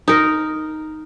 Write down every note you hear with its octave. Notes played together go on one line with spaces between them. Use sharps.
D#4 A#4